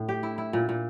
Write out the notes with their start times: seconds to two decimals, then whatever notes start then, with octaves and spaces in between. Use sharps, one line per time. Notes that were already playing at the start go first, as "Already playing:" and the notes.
Already playing: A2
0.09 G4
0.23 E4
0.38 E4
0.53 A#2
0.69 A#2